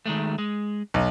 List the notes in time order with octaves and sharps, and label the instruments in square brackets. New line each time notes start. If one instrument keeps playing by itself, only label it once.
[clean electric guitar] D#3 G#3 A3
G#3
[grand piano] B1